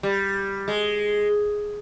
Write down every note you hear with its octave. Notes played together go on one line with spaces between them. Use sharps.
G3
G#3